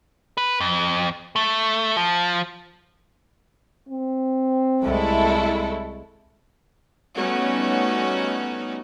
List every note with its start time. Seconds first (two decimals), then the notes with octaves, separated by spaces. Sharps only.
0.38 B4
0.60 F2
1.36 A3
1.97 F3
3.89 C4
4.82 C2 G#3 A3 E4 A4
7.16 G3 A3 B3 C#4 D#4 F#4